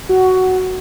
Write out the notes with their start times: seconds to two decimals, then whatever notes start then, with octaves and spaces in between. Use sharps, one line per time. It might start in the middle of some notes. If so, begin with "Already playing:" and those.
0.09 F#4